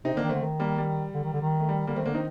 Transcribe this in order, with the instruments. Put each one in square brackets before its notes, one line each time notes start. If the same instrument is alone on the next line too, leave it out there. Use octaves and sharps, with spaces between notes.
[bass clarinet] C3 [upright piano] C4 D#4
[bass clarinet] D3 [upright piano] A#3 D4
[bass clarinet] D#3
[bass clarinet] D3 [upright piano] A3 C4
[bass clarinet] D#3
[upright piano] G3 A#3
G3
[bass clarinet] D3
D#3
D3
D#3
[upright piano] A3
G3
[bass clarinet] D3 [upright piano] G3 A#3
[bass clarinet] D#3 [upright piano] A3 C4
[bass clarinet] D3 [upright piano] A#3 D4
[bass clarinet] D#3 [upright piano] C4 D#4